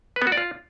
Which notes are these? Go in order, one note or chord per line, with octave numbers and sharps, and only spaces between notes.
B4
B3
F#4
D5
F4